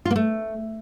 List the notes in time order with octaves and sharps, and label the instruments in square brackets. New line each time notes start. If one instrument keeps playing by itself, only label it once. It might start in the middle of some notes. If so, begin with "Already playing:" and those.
[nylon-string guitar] F4
A#3
A3